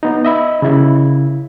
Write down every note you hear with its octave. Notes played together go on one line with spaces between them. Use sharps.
B3 D#4
D#5 E5 B5
C#3 E4